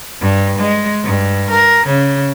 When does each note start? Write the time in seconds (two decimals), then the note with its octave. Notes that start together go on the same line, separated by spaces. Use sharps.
0.21 G2
0.59 G#3
1.04 G2
1.51 A#4
1.87 C#3